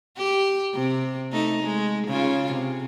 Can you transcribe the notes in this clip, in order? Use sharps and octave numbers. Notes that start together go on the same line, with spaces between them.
G4
C3
A3 D#4
G#3
C#3 F4
C3